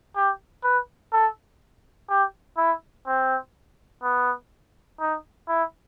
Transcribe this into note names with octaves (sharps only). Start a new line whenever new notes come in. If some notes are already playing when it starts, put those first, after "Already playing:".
G4
B4
A4
G4
E4
C4
B3
D#4
E4